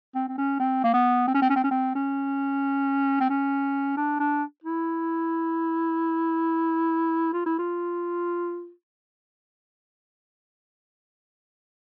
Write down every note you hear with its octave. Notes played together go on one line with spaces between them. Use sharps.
C4
C4
C#4
C4
A#3
B3
C4
C#4
C4
C#4
C4
C#4
C4
C#4
C4
C#4
D4
D4
E4
F4
E4
F4